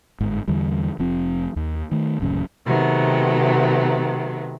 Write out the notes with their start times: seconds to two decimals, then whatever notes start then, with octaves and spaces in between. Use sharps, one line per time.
0.20 G1 G#2
0.48 E2 D3 E3 G3
0.99 F1 F3 C4
1.56 D#2
1.91 D#3 A3
2.20 D1 A1 F#2 C#3
2.67 C3 D#3 F#3 A3 B3